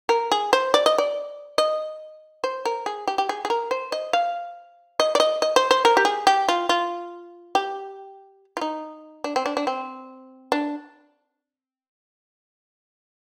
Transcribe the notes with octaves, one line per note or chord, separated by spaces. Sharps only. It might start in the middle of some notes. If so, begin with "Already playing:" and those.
A#4
G#4
C5
D5
D#5
D5
D#5
C5
A#4
G#4
G4
G4
G#4
G#4
A#4
C5
D#5
F5
D#5
D5
D#5
D#5
C5
C5
A#4
G4
G#4
G4
F4
F4
G4
F4
D#4
D4
C4
D4
D4
C4
D4